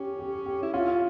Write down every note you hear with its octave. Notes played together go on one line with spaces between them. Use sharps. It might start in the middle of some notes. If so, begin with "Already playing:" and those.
Already playing: C#4 G4
G4
G4
E4
C#4 F4